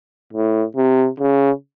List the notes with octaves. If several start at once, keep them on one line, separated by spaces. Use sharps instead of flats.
A2
C3
C#3